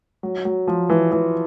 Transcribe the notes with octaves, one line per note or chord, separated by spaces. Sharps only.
F#3
F#3
F3
E3
E3